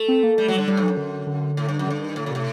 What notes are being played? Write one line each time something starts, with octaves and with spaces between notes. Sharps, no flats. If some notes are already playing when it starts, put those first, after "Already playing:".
Already playing: A3
C4
A#3
G3 A3
F#3
G3
D3
A2 G3
G2
F#3
F#2
D3
D3
A2
G2
F#2
G2 D3
D#3
A2 D3
A#2
A2 C3